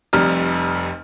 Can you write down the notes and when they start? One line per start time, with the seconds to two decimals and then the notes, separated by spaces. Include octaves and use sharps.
0.13 F1 F2 G3 A#5 F6